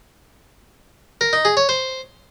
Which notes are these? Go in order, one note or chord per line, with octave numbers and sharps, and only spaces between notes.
A#4
D#4
G#4
C#5
C5